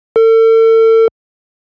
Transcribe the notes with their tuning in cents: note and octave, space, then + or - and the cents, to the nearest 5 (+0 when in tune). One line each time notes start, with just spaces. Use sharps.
A4 +40